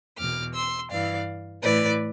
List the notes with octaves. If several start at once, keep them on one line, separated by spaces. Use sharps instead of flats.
E2 B2 D6 F6
C6 E6
G2 E3 D5 F5
A2 E3 B4 D5